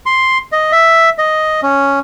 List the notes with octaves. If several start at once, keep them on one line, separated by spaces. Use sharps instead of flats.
C6
D#5
E5
D#5
C#4